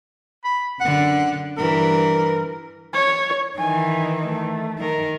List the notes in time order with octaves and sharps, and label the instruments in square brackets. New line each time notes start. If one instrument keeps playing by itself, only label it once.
[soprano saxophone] B5
[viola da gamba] F#2 D3 [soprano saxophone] F#5
[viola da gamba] G2 E3 [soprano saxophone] A#4
[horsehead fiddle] C#5
[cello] D#3 E3 [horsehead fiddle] G#5
[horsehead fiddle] A3
[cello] D#3 A#4